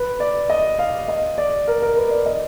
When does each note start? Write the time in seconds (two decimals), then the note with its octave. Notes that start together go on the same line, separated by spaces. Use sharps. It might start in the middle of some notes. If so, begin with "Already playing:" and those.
Already playing: B4
0.20 D5
0.50 D#5
0.79 F5
1.08 D#5
1.38 D5
1.67 A#4
1.82 A#4
1.97 B4
2.11 D5
2.26 D#5